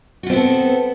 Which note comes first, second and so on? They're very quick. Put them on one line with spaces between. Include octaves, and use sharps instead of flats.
F#4 F4 C4 B3 A4